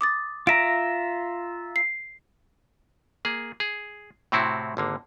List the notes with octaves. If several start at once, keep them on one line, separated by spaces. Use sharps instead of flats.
D6 D#6 A6
F4 E5 A#5 A#6 D7
C7
A#3 G#4
G#4
A2 C3 C4 E4 F#4
G#1 D3 A#3